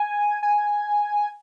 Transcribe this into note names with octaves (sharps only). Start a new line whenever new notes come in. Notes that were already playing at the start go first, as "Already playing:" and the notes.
Already playing: G#5
G#5